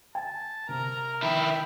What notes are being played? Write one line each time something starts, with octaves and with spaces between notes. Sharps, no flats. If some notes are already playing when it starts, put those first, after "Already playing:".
G#5 A5
C3 A#4 A#5
D#3 E4 E5 G5